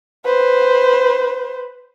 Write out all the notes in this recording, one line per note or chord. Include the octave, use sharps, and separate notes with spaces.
B4 C5